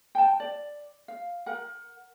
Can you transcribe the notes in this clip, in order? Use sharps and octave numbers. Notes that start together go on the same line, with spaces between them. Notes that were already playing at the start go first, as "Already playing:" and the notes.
G5 A5
D5
F5
A#4 F#5